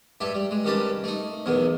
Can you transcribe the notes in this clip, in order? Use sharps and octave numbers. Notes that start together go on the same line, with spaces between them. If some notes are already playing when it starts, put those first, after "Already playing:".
G2 G4 A4 E5
G3
G#3
C2 D#3 C#4 G4 B4 A5
A3 D#4
B1 E2 D#3 B3